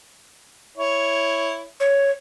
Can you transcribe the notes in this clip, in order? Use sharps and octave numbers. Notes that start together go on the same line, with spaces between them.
E4 C#5
C#5